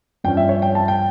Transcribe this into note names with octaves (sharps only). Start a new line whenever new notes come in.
G2 F3 C#4 G5
E5
C#5
G5
A5
G5